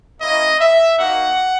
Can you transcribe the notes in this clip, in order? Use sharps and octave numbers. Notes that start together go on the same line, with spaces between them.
A#3 C#4 E4 D#5
E5
A#3 D#4 F#4 F#5